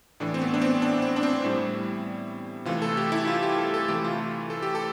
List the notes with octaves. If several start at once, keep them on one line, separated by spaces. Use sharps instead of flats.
A2 E3 A3 D4
C4
B3
D4
C4
D4
C4
D4
C4
A2 G3 E4
C3 E3 A3 F4
A4
G4
E4
F4
G4
A4
A4
C3 E3 A3 G4
F4
F4
A4
G4
A4